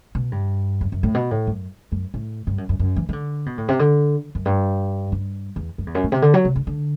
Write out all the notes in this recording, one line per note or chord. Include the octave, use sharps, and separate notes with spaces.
B2
G2
F#2
F#2
A2
B2
A2
F#2
F#2
A2
G2
F#2
F#2
F#2
E3
E3
D3
B2
A2
C3
D3
F#2
G2
G2
E2
F#2
E2
F#2
A2
C3
D3
F#3
C3
D3
D3